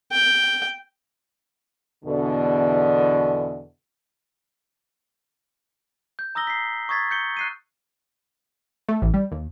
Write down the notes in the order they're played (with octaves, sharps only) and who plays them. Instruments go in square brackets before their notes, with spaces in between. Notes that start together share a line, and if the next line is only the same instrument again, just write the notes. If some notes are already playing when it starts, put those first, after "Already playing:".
[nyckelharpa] G5
[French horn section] E2 B2 D3
[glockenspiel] G6
A#5 D#6 E6 A#6 G7
B6 C7
C#6 D#6 G#6 A6 B6
G6 C#7 G7
F#6 C7 D#7
[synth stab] A3
A1
G3
D#2